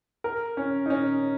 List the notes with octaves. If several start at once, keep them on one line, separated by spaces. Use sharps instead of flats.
A#4
C#4
D#4
C#4